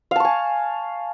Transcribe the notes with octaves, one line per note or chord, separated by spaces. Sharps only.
F5 G#5 A5 C#6